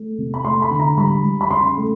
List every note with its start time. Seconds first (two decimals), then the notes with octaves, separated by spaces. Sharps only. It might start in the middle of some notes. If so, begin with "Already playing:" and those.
Already playing: A3
0.18 C3
0.34 B5
0.45 A3 C6
0.62 B5
0.71 D3
0.79 A#5
0.97 G3 B5
1.24 G3
1.41 B5
1.50 C#3 C6
1.77 A3